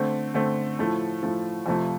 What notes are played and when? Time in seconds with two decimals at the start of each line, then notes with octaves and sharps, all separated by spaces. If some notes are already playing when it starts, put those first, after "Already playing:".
Already playing: D3 A3 C4
0.34 D3 A3 C4
0.79 A2 F3 A3
1.23 A2 F3 A3
1.66 F2 C3 F3 A3